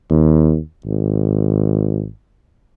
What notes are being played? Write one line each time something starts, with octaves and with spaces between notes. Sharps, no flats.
D#2
G#1